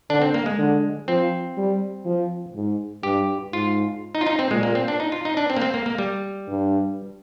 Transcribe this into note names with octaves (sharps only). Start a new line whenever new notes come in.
D3 D4
C4
A#3
G#3
D3
F3 C4
G3
F3
G#2
G2 G4
G#2 F4
D#4
F4
D#4
C4
A#2 G#3
A#3
C4
D4
D#4
F4
D#4
D4
C4
A#3
C4
A#3
A#3
G3
G2